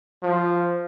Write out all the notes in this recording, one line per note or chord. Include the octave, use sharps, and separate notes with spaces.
F3